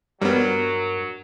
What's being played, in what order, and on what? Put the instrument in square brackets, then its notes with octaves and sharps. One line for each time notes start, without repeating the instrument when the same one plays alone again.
[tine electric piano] G2 A#4 C#5 [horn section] F#3 [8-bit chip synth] G3 B3